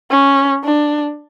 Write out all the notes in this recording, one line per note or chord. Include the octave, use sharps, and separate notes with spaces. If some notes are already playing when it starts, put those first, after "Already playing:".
C#4
D4